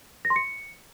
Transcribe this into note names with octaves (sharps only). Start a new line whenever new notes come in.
A#6
C6
C#7